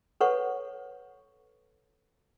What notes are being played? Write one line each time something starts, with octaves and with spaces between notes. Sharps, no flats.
A4 B4 C#5 F#5 C#6